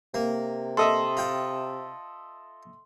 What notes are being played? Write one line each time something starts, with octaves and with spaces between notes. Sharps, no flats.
C3 A#3
A4 D#5 E5 C6
F4 G5